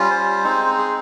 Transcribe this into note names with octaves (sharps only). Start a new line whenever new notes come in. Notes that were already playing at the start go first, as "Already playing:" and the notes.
Already playing: G3 C#4 F4
C5
G#3 C4 D#4
G#4